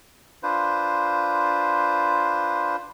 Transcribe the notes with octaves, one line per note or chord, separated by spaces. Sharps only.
D4 F4 B4 C5